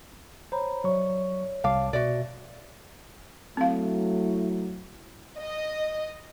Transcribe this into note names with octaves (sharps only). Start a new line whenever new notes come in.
C5 C#5 A#5 B5
F#3 C#5 D5 E5 C#6
C2 F5 A5 D6
B2 F#4 D5 E5
F#3 A3 C4 E4 F5
D#5